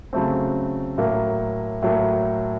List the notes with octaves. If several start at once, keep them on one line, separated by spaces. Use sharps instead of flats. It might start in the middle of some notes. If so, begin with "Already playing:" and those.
C#3 F#3 A3 C4
A2 F#3 A#3
A2 F#3 A#3